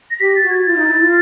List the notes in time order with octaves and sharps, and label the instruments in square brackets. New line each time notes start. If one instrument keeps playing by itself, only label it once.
[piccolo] A#6
[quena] G4 [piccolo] B6
[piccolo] A6
[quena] F#4
[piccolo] G#6
[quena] F4 [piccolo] A6
[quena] D#4
E4
F4